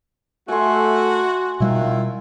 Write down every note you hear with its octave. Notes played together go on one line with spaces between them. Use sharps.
A3 F#4 G#5 C6
B2 D#3 G3 E4 F4